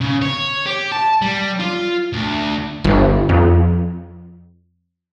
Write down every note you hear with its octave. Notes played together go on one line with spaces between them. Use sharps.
C#3
C#5
G4
A5
G3
F4
D2
G1
F2